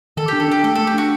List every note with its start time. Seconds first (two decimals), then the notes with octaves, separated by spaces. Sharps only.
0.17 D#3 A4
0.28 D4 G4
0.40 A4
0.48 D4 G4
0.64 A3 A4
0.75 A3 A4
0.87 G4
0.94 D4 F#4